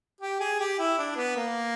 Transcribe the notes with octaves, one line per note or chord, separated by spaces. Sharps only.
G4
G#4
G4
E4
D4
B3
A#3